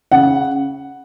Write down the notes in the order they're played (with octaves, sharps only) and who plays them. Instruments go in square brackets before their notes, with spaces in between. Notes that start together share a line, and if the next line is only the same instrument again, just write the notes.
[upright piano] C#3 F#5